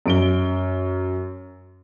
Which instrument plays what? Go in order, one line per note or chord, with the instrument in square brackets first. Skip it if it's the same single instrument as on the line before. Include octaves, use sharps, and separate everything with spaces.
[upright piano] F#2 D7 G7